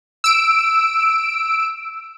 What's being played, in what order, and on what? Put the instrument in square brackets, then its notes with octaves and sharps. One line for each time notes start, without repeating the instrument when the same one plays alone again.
[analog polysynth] E6 D7